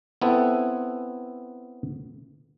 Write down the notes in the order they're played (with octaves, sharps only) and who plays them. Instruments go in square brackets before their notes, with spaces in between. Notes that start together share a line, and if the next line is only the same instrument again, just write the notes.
[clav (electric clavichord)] B3 C4 E4 A4 B4